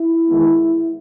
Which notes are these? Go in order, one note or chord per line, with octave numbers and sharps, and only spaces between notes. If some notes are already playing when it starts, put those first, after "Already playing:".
Already playing: E4
E2 D#3 G#3 B3